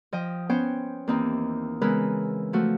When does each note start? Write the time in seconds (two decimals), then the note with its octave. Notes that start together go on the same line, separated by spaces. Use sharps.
0.12 F3 D#5 G5
0.49 B3 C#4 C5 G5
1.07 D#2 E3 C4 D#4
1.81 C#3 E3 G#3 B3 A#4 B4
2.53 F3 A3 F#4